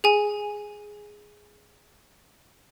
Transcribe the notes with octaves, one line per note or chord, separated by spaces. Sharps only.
G#4 G#5